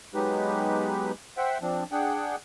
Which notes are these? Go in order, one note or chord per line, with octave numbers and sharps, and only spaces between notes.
F#3 G#3 B3 D#4 G4 B4
C5 E5 F#5 G5
F3 C4 D4
D4 G#4 F#5 G5